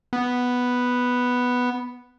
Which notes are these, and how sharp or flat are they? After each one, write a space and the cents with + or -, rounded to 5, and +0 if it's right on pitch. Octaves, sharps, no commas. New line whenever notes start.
B3 +0